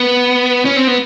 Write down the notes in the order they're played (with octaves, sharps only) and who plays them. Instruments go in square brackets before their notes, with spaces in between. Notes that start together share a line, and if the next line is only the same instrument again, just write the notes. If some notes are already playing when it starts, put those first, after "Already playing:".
Already playing: [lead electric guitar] B3
C#4
C4
B3